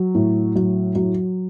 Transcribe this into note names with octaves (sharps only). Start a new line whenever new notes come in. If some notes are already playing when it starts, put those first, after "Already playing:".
Already playing: F#3
A2
F#3
F#3